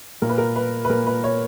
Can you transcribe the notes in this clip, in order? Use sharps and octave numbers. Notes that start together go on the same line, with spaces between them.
A#2 A#4
B4
A#4
B4
B4
A#2 A#4
B4
C#5